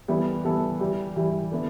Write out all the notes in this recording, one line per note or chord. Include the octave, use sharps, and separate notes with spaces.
E3 G3 B3 E4 A4
E3 G3 B3 E4 A4
E3 G3 E4
E3 G3 E4
D3 B3 E4